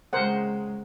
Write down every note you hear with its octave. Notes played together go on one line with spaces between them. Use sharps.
C#3 G#3 A#4 C5 F#5